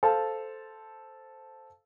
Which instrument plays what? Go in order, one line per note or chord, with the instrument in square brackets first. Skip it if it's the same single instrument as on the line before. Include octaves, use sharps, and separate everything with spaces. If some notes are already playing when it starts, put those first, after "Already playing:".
[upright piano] A4 C5 F5 A5